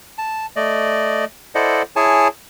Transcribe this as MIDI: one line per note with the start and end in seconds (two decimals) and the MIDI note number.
0.18 0.46 81
0.56 1.25 57
0.56 1.25 74
0.56 1.25 75
1.55 1.82 64
1.55 1.82 69
1.55 1.82 72
1.55 1.82 74
1.55 1.82 75
1.55 1.82 78
1.96 2.28 64
1.96 2.28 68
1.96 2.28 73
1.96 2.28 80
1.96 2.28 81